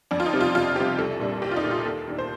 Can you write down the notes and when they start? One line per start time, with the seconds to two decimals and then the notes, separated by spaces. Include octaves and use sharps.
0.11 F2 D4
0.20 F4
0.26 D#4
0.33 C3 G3 C4
0.41 F4
0.55 F2 F4
0.76 C3 G3 C4 G4
0.98 C2 A4
1.20 A#2 G3 D4
1.42 C2 G4
1.51 F4
1.56 D#4
1.63 A#2 G3 D4
1.71 F4
1.85 D#2 A4
2.07 D#3 A#3 D4
2.19 C5